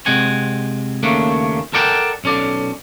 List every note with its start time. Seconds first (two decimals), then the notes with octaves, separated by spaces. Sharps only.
0.06 C3 G#3 C4 F#5 G#5
1.03 D#2 C#3 A3 A#3 C#4 D4
1.73 A4 A#4 D5 F#5 G5 A5
2.24 B1 C#4 A4 D5